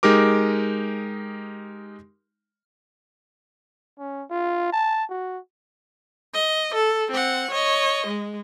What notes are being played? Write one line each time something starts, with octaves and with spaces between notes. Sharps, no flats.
G#3 D#4 G4 A#4 D6
C#4
F4
A5
F#4
D#5
A4
C4 F#5
C#5 D#5
G#3